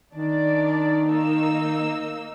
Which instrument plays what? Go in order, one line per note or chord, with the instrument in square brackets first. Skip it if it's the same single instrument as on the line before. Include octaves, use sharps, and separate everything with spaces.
[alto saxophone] D#3 [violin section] D4 D5
[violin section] A#3 D#4 E6